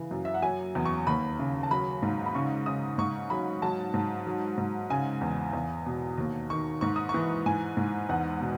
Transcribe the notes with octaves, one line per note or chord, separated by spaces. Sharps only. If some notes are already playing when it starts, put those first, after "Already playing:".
Already playing: C#3 E3
F#2
E5
F#5
F#3 G#5
E2
C#6
D#2 B5
C#3
A5
F#3 B5
G#2
B5
C#3 C#6
C#3 D#6
G#2 C#6
F#3 B5
F#3 A5
G#2
F#3
G#2
C#3 G#5
E2
E2
B2
D#2
D#3 C#6
G#2 C#6
D#6
C#6
E3
G#2 G#5
G#2
E2 F#5
B2